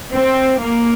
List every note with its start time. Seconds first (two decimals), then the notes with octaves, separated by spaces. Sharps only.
0.12 C4
0.60 A#3